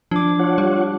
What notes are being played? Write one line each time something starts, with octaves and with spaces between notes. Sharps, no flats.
F3 D4 D6
F4 C#5 F#5
G3